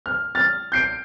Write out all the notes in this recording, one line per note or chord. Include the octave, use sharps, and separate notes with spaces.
F6
F6 A6
G6 C7 D7